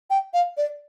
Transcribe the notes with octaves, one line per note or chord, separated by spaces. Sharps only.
G5
F5
D5